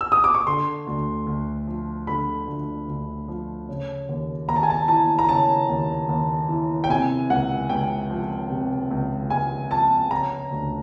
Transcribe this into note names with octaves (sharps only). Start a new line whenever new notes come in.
E6
D#6
D6
C#6
D3 C6
D2
D2
F3
D3 B5
D2
D2
F3
C#3
D#2
D#2 A#5
A5
G#5
A5
E3 A5
A#5
C#3 A5
D#2
D#2
E3
G5
C3 G#5
C#2 F#5
C#2 G5
F3
C3
C#2
C#2 G#5
F3 A5
C#3 A#5
D2